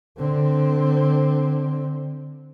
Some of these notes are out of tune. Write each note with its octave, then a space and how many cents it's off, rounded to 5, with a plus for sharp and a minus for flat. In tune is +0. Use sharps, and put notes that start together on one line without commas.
D3 +10 C4 +0